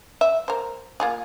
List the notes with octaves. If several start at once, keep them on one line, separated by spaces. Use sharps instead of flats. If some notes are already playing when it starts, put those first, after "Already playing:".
E5
A#4 C5
A#3 F4 G#4